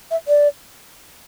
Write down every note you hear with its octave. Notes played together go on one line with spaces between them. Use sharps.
E5
D5